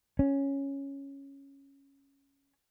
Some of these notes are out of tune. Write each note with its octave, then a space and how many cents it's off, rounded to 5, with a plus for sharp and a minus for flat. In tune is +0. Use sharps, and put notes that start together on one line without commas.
C#4 -5